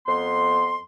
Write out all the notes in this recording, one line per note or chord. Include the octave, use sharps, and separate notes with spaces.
F2 B3 C6